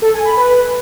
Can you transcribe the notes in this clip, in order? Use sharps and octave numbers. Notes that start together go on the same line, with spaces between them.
A4
G#5
B5
B4